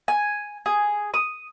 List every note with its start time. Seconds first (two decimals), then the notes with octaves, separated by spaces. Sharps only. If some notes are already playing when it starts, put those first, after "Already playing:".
0.08 G#5
0.66 G#4
1.14 D#6